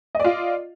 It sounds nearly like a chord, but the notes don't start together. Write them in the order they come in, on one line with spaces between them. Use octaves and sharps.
D#5 D5 F4